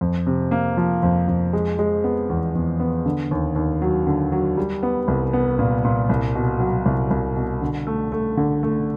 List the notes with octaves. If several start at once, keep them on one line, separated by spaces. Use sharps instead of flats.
F2
C3
A#3
F3
F2
F2
G#3
G#3
B3
E2
E2
B3
D3
D#2
D#2
F#3
D3
F#3
G3
B3
C2
B3
A#2
A#2
C2
B2
F#3
C2
C2
B2
D3
A3
A3
D3
A3